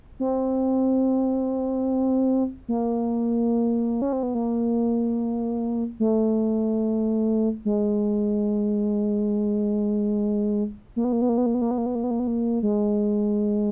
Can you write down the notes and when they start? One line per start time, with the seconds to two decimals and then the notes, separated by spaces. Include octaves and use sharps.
0.20 C4
2.68 A#3
4.02 C#4
4.13 C4
4.23 B3
4.35 A#3
6.00 A3
7.65 G#3
10.96 A#3
11.05 B3
11.13 A#3
11.22 B3
11.29 A#3
11.38 B3
11.46 A#3
11.55 B3
11.62 A#3
11.71 B3
11.78 A#3
11.86 B3
11.95 A#3
12.04 B3
12.11 A#3
12.20 B3
12.27 A#3
12.63 G#3